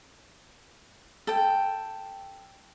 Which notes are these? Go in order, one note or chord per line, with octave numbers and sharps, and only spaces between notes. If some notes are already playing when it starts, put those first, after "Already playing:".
A4 G5